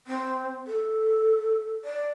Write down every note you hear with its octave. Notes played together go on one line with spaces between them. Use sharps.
C4
A4
D5